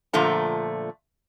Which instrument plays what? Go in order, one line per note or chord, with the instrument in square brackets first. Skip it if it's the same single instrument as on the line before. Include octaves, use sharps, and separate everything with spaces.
[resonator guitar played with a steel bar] A#2 D3 F3 A3 A#5